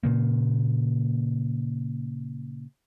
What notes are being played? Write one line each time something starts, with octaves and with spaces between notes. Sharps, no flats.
A#2 C#3 A#3